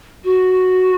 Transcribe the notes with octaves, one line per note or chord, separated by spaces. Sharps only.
F#4